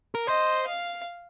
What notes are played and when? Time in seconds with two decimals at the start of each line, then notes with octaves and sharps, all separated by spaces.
0.15 A#4
0.27 C5 D#5
0.67 F5